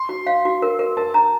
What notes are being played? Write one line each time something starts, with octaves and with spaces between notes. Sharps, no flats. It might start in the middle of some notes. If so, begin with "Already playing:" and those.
Already playing: C6
F#4
F5
F#4
A#4
A#4
A#4 A5
A5 A#5